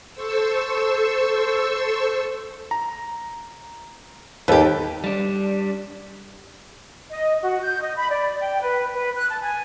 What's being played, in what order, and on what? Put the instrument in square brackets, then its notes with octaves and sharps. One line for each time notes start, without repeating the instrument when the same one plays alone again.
[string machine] A4 C5 C#6 E6
[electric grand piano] A#5
[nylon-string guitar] D#2 G4 [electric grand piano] A4 B4
[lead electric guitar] G3 D4
[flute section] D#5
F#4
G6
D#5
B5
D5
G5
B4
B4
F#6
A5
G#5